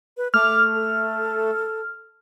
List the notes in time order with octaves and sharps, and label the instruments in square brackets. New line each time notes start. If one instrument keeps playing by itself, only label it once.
[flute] B4
[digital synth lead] A3 [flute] D6 [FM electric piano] F6
[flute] A4